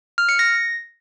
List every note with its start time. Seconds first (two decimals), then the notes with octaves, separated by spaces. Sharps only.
0.18 F6
0.29 C#7
0.39 A#6